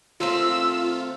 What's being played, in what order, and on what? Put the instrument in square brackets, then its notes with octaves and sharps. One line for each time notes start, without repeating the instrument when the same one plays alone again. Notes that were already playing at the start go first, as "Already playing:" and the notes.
[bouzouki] D#3 A3 C4 [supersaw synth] F4 [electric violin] E6